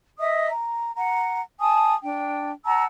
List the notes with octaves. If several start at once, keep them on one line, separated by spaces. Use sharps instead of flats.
D#5 E5 D#6
A#5
F#5 A#5
G#5 A5 D#6
D4 G5
F#5 A5 A#5 E6